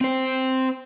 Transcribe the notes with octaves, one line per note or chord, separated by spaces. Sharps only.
C4 C5